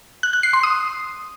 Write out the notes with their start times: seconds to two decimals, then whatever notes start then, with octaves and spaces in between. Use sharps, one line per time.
0.23 F#6
0.33 F#6
0.43 C7
0.53 C6
0.63 D#6